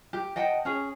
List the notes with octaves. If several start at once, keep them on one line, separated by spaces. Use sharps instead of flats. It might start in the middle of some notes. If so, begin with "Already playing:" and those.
G4
D#5 F#5 G5 A5
C#4 G#4